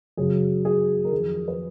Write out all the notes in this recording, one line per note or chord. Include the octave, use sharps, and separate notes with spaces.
F#2 C#3 F#3 G#4
G#4
A#4
F2 D#3 F#3 G#4
B4